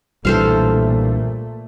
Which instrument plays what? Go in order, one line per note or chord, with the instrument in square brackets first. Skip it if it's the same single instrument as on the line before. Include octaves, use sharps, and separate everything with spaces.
[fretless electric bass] B1 G2 E3 [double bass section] A#2 A3 [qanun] A4 C5 F5